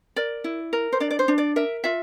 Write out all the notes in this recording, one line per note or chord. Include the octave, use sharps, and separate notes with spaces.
A#4 D5
E4
A#4
C5
D4 D5
D5
C5
D4
D5
A#4 E5
F4 E5